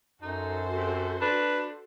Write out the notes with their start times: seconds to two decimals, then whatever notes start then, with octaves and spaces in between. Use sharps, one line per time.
0.22 F#2 D#4 F#4 A4 C5
0.76 C3
1.21 D4 B4